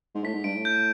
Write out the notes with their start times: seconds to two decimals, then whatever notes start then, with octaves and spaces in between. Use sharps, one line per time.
0.15 G#2
0.24 A2 B6
0.34 G#2
0.44 G2 D7
0.55 A2
0.65 G6